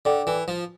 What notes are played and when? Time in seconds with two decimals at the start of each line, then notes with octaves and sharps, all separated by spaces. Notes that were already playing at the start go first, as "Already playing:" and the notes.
0.05 D3 A4 D5 G5 D6
0.27 E3
0.48 F3